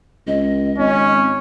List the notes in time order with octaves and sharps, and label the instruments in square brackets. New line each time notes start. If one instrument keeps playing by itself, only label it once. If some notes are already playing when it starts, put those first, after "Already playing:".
[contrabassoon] C#2 [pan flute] D#5
[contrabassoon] G#1 [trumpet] C#4